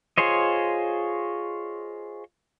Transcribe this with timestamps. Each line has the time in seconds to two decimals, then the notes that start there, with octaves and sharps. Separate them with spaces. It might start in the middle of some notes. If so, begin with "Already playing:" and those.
0.18 F4 G#4 C5 C#5 D#5